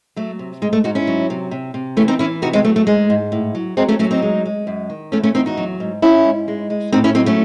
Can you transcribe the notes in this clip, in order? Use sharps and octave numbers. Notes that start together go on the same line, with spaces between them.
F#3 A3
C3
G#2 G#3
A3
G#2 D#4 F#4
C#4 E4
F#3
C3
C3
C3
E3 A3 C#4
C4 D#4
E3 C#4 E4
C3 D#4 F#4
G#3 C4
F#3 A3
A3
G#2 G#3
G#2
A2
F#3
F#3 G#3 C4
A3 C#4
F#3 A3 C#4
C4 D#4
G#3
G#3
F#2
D#3
E2 A3 C#4
A3 C#4
E2 C4 D#4
D#4 F#4
F#3
G#2
G#2 C#4 E4
G#2
G#3
G#3
A2 C4 D#4
C#4 E4
F#3 C4 D#4
A3 C#4